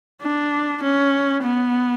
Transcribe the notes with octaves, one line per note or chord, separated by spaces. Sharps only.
D4
C#4
B3